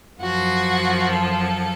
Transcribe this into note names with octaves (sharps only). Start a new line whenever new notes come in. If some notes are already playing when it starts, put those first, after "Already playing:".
F#2 F3 F#4
A4